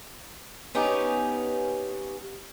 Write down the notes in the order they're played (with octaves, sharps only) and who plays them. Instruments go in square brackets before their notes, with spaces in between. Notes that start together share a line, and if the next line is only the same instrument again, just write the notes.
[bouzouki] B3 C#4 D#4 G4